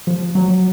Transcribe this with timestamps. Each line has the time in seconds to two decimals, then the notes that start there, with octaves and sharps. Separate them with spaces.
0.07 F3
0.35 F#3